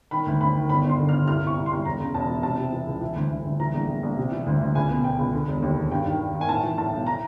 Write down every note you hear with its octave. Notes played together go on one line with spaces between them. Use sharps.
D#3 B5
D2
D2 B5
D#3
G1 B5
G1
C6
D3
F6
G1
C2 F6
C2 C#6
C2
C6
C2
E1 A#5
C#3
E1 A5
E3
C3 A5
C3
E3
C#2
E3
D2
D2
D2
E3 A#5
A#1
A#1
A#1
C3
E3
D2
D2
C#2 G#5
B2
B2 G5
C#2
D3
E1
D#2
E1
G2 G5
D#3
D#3
D#3
G#5
A2 A5
E3
A2 A5
B1
A#5